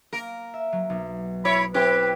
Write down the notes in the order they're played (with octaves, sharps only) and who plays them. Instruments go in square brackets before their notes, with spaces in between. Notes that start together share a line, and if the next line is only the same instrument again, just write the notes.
[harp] A#3 [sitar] A#4
[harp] E5
F#3
B1
[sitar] E4 C#5 [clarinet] B5
[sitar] C4 E4 G4 [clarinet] B4